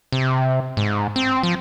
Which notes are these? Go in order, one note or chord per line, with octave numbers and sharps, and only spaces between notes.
C3
G#2
C4
F3